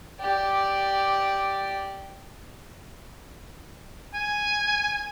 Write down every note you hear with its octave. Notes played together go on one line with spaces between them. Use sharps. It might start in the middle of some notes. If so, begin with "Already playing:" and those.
G4 D5
G#5